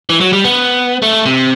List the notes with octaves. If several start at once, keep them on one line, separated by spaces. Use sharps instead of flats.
E3
F#3
G3
B3
A3
C3